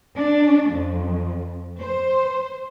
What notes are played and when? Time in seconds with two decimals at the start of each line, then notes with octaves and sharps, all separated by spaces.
0.17 D4
0.71 F2
1.80 C5